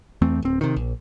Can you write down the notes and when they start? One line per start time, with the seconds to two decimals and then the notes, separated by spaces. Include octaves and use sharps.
0.22 E2 E3 A3 C4
0.42 D1 C4
0.61 C3 D#3
0.76 A#1